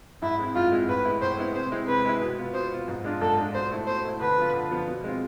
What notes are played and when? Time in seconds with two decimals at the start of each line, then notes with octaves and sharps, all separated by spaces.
0.22 G#2 E4
0.39 G#3 C4 E4
0.55 G#2 F4
0.72 G#3 C4 E4
0.89 A2 B4
1.05 G#3 B3 E4
1.22 A2 C5
1.38 G#3 B3 E4
1.55 C3 C5
1.72 G#3 C4 E4
1.88 C3 B4
2.05 G#3 C4 E4
2.22 B2
2.38 B3 F4
2.54 B2 C5
2.72 B3 F4
2.88 G#2
3.04 G#3 D4 F4
3.21 G#2 A4
3.38 G#3 D4 F4
3.54 B2 C5
3.71 A3 E4
3.87 B2 C5
4.04 A3 E4
4.21 D3 B4
4.38 F3 B3 F4
4.54 D3
4.71 F3 B3 F4
4.87 B2
5.04 G#3 C4 F4